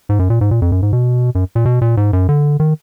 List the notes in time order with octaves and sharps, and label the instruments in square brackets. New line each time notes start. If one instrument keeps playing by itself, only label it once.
[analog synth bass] G#2
F#2
A#2
G#2
A#2
F2
F#2
G#2
B2
F#2
A#2
B2
A#2
G#2
F#2
D3
D#3